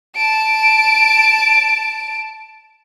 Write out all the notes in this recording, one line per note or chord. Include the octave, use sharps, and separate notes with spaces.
A5 D7